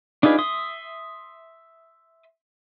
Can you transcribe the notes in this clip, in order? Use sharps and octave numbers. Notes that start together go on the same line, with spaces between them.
D4 D#4 F4 G#4 B4
E5 C6 D#6